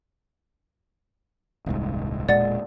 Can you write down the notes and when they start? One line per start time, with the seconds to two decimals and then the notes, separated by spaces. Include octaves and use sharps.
1.66 D#1 C2 G#2
2.29 E1 A#2 G#3 D5 F#5 A6